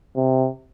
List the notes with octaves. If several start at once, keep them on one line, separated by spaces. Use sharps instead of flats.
C3